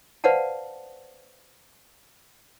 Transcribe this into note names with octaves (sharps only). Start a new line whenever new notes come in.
B4 C5 D5 F5 F#5 A5